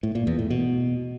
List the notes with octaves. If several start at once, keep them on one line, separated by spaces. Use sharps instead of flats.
A2
A#2
E2
A2
B2